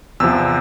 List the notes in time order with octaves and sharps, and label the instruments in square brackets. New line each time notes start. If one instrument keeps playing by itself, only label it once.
[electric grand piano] E2 C3 F3 E6